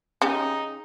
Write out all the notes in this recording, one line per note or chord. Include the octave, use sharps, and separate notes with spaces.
C#3 D#4 G4